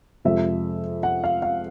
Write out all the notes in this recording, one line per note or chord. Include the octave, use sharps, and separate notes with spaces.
F2 C3 F3 G#3 E5
F#5
F5
F5